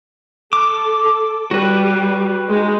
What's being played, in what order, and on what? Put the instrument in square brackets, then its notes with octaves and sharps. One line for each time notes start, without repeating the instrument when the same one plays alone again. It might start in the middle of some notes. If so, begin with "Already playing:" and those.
[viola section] A4 [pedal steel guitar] D6
[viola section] G3 [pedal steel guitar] F#4 B4
[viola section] G#3 D#4